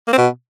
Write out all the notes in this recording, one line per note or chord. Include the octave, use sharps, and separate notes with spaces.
A#3
C4
B2